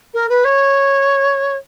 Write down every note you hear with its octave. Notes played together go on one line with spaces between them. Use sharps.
A#4
B4
C#5